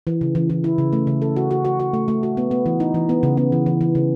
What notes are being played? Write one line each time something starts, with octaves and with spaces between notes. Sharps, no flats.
E3
C#3
E3
E3
E4
C#3
A3
C#3
A4
F#4
F#4
F#4
F#4
A3
A3
F#4
B3
B3
E3
D#4
E3
B3
C#3
B3
E3
E3
E3
C#3